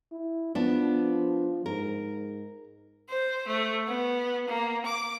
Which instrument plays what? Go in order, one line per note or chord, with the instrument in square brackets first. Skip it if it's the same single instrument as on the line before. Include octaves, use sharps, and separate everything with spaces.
[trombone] E4
[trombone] F3 [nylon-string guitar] B3 D4
[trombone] G#2 [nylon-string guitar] A#4
[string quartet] C5
A3
B3
A#3
D6